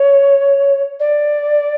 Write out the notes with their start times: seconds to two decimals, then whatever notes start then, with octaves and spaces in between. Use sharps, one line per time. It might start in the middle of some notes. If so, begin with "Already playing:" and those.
Already playing: C#5
0.99 D5